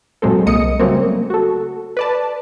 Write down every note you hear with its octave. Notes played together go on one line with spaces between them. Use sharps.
A#2 F#3 G#3 C4 A4
C2 A#3 D#5 D#6 C#7
C#3 F#3 G3 A3 A#3 C4
F#4 A4
B4 D5 A5